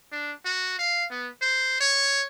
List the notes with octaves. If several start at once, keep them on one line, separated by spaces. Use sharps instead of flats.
D4
F#4
F5
B3
C5
C#5